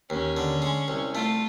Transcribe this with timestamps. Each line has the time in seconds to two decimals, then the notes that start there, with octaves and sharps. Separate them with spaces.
0.10 D#2 C#4
0.37 D3
0.62 G#3
0.88 C2
1.14 A3 F4